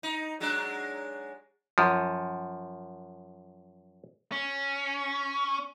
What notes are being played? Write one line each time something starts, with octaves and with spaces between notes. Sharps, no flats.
D#4
F#3 G#3 D4
F#2 F3
C#4